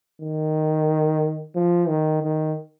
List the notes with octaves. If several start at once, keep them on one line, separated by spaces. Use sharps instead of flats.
D#3
F3
D#3
D#3